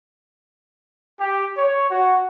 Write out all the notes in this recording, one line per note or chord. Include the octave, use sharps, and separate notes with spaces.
G4
C#5
F#4